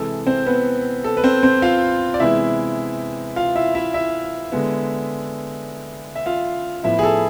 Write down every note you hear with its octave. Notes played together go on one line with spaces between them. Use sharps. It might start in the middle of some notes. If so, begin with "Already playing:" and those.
Already playing: C3 E3 G#3 A4
C4 C5
B3 B4
A4
B4
C4 C5
C4 C5
F4 F5
D5
C3 E3 G#3 B3 E4 E5
F4 F5
E4 E5
E4 E5
E4 E5
D3 G#3 B3
E5
F4 F5
A2 F3 B3 E4 E5
G#4
A4